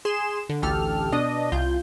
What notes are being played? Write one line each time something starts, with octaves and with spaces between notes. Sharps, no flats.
G#4 C6 E7
D3
A1 D2 G4 A4 F6
B2 D4 D#5
C2 F4 G6